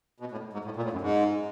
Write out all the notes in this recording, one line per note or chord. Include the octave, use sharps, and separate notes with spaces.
B2
A2
G#2
A2
A#2
A2
F#2
G#2